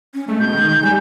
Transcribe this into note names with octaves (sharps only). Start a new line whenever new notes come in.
C#4
G#3 A3
B2 G6
D#3
G3 G#5